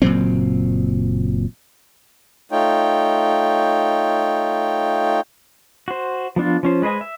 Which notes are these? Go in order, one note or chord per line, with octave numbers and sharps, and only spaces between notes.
F#1 A#2 F#3 C4
A3 D#4 F4 C#5 G5
F#4 C5
F3 B3 D4 F4
F3 C#4 C5
G#3 B4 C5 D#5 G#5
E5